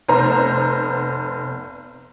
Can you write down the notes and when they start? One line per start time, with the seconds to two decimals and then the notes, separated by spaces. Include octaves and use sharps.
0.09 F1 B3 C5 A#5